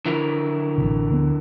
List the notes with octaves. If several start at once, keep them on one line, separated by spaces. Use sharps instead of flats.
D3 E4 A#4
A1 C3
D2 B3